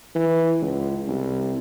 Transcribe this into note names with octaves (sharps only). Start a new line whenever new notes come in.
E3
C#2
C2